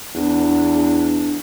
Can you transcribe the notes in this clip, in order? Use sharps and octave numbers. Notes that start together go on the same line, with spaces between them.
E2 D4